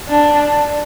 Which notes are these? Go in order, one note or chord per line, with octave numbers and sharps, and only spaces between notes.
D4